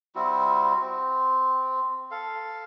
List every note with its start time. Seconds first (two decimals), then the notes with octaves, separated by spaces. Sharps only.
0.16 G3 C4 E4 F#4
0.81 C4
2.11 A4 F5